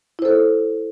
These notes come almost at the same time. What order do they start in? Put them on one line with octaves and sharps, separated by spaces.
E4 C5 A4